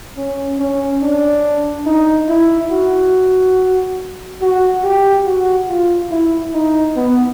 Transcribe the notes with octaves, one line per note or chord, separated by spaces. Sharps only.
C#4
C#4
D4
D#4
E4
F#4
F#4
G4
F#4
F4
E4
D#4
B3